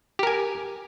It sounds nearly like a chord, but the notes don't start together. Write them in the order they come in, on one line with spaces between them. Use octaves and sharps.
G4 A#4 G#5